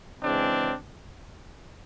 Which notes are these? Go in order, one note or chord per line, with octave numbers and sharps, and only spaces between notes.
C#3 E3 G#3 C4 D4